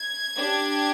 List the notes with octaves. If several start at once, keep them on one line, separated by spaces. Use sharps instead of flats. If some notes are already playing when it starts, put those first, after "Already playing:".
Already playing: G#6
D4 G4